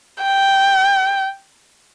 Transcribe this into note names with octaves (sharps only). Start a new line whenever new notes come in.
G5